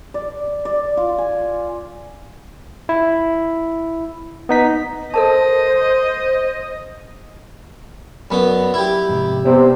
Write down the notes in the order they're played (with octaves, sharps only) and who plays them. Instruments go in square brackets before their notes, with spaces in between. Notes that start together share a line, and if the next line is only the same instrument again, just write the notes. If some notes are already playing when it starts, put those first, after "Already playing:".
[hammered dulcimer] D5
D5
F4
G#5
[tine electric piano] E4
B3 D#4 B6
[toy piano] A4 A#4 A5 [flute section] C5 [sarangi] D#5
[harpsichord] F#2 B3 [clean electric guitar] D5 B5
[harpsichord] E4 G4
[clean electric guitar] F2 G#2 C3
[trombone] C3 [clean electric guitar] B3 C5 D5